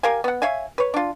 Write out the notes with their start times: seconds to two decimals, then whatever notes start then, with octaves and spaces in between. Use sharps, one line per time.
0.03 G4 A#4 F5 G#5
0.24 B3 F#5
0.42 C#5 E5 F5 G#5
0.78 B4 C#5
0.94 D4 F4